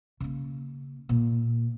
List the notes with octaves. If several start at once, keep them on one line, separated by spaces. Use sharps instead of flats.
C#3 A#3
A#2